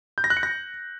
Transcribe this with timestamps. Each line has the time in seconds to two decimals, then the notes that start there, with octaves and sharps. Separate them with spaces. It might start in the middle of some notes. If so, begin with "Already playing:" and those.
0.18 G6
0.24 A#6
0.30 F#6
0.37 C#7
0.43 A#6